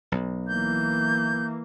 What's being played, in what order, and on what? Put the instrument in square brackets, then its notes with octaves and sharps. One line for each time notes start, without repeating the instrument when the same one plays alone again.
[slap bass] B1
[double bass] E3 A#3 [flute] G6